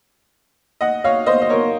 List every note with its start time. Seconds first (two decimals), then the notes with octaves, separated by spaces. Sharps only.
0.81 D#5 F#5
1.04 C#5 F5
1.26 C5 D#5
1.42 D#5
1.50 A#4 C#5